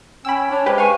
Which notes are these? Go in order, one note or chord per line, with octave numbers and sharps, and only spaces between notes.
C#4 G5 B5 E6
D4 C#5
G#3 G4 B4 C5
F5 G#5 C#6